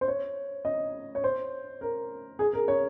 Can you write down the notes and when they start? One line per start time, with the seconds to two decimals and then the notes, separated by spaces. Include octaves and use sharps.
0.01 C5
0.08 C#5
0.65 D#5
1.15 C#5
1.24 C5
1.81 A#4
2.39 G#4
2.53 A#4
2.68 C#5